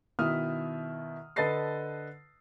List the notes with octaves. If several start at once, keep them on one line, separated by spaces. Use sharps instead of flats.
B2 D#3 E4 E5 D#6 F6
D3 A4 B4 D#5 A6 C7